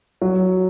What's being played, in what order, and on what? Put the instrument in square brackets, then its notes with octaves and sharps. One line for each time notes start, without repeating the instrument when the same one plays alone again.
[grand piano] F#3